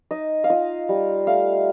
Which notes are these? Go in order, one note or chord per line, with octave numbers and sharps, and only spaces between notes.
D#4 D#5
F5
F4 D#5
G3
A3 F5